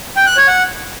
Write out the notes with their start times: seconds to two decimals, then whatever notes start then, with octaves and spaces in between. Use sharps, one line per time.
0.16 G5
0.27 F#6
0.37 C#5
0.48 F#5